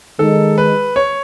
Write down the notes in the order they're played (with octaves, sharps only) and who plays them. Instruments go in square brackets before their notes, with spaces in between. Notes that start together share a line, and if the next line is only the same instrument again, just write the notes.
[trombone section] D#3 G#3 D#4 [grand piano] A4
[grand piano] B4
C#5